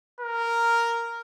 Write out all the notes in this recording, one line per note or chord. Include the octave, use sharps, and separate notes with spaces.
A#4